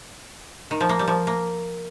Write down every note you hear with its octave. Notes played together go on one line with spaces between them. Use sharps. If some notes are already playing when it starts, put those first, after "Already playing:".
D#3
F3
A#3
G3
F3
A#3